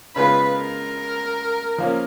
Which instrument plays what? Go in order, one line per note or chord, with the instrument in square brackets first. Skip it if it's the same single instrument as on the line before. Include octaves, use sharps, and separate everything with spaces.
[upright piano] C#3 G#3 B3 F4 [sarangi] B4
[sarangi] A#4
[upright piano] F3 A#3 C#4